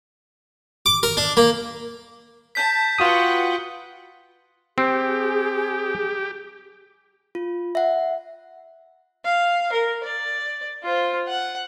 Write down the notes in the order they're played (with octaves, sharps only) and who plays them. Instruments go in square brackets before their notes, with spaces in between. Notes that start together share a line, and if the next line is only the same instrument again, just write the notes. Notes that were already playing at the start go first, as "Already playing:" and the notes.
[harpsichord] D6
A#4
D4
A#3
[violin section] A5 [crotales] G6 B6
[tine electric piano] F4 F#4 D#6 [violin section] B4 F#5 G5
[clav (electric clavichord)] C4 [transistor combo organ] G4 [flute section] G#4
[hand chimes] F4
E5 F#5
[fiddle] F5
A#4
D5
F4 C5
F#5